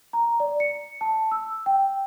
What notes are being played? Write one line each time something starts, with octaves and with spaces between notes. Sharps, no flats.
A#5
D5
C#7
A5
E6
G5